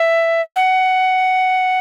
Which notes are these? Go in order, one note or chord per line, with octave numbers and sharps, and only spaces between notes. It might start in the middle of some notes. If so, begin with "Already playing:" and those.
Already playing: E5
F#5